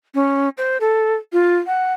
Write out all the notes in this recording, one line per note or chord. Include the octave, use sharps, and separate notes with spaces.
C#4
C5
A4
F4
F#5